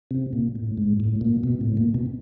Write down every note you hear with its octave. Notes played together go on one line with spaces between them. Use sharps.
C3
A#2
A2
G#2
A2
A#2
B2
A2
A#2
B2